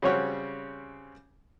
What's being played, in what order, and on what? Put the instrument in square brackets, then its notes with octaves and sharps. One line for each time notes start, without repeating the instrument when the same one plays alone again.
[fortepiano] C#3 G3 C4 C#4 F#4 C#5